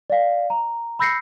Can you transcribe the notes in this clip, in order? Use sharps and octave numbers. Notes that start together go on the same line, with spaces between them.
D5 F5
A#5
B5 E6 G6 A#6 C7 C#7